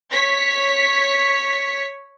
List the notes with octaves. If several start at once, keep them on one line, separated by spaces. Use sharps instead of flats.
C#5 B6